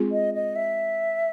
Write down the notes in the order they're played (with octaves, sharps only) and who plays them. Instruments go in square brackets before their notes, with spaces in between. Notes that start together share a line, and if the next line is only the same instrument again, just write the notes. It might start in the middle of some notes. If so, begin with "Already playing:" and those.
Already playing: [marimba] G#3 C4 F4 G#4
[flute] D#5
D#5
E5